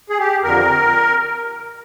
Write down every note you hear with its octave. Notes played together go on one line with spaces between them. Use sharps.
G#4
G4
F2 D3 A#4